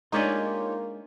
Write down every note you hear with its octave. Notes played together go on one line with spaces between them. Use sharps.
G#3 A#3 D4 D#4 F4 G4 C#5 G#5